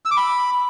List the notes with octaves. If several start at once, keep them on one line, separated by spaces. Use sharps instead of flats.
E6
D6
B5